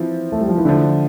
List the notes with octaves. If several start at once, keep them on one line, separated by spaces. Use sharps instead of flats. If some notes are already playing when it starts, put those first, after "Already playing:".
Already playing: E3 F3 C4 F4
A3
G3
F3
E3
D3 F3 A3 E4